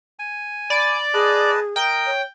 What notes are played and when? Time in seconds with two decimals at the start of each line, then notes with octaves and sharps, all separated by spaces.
0.19 G#5
0.70 D5 B5
1.14 G#4 B4 D#5 A5
1.76 A#4 D#5 G5
2.06 C#5